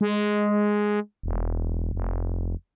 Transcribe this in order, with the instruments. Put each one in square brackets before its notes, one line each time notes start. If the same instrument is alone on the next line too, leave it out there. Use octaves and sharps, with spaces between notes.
[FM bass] G#3
E1
F1